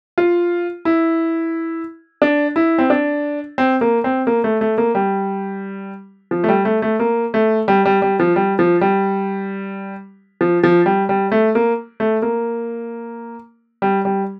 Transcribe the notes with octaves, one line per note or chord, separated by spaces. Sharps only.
F4
E4
D4
E4
C4
D4
C4
A#3
C4
A#3
A3
A3
A#3
G3
F3
A3
G3
A3
A3
A#3
A3
G3
G3
G3
F3
G3
F3
G3
F3
F3
G3
G3
A3
A#3
A3
A#3
G3
G3